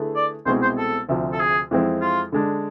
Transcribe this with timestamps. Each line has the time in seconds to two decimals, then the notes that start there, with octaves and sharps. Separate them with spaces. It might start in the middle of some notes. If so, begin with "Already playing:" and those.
Already playing: D3 A3 E4 G#4 B4
0.16 D5
0.46 C2 B2 G#3 C4 E4 C5
0.62 C5
0.78 A4
1.09 D2 C3 F3
1.33 A4
1.40 G#4
1.71 F2 E3 G#3 C4 E4
2.01 F4
2.32 D3 G#3 D4